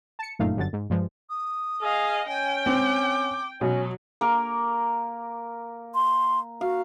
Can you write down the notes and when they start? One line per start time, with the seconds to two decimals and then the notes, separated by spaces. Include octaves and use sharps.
0.19 A5 C#7
0.39 G1 F#2 A#2 A3 D#4 F5
0.57 G1 F#2 D3 A6
0.73 G#2
0.90 G2 F3 G#3
1.30 D#6
1.82 G#4 D#5 F5
2.28 C#4 G5 G#5
2.66 C4 D6
3.61 B2 F#3 C#4
4.21 A#3 A#4
5.95 C6
6.61 F#4 F5